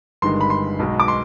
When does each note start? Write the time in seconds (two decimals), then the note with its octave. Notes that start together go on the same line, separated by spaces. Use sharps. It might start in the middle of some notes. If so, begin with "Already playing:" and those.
0.22 G1 G2 D#3 G#3 C6
0.41 B5
0.50 C6
0.79 B1 B2 G#3
1.00 D6
1.08 C6